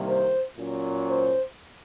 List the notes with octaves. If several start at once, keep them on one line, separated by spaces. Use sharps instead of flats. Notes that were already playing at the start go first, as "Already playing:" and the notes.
Already playing: C2 C3 D#3 A#3
C5
A#2 F#3 C#4
C5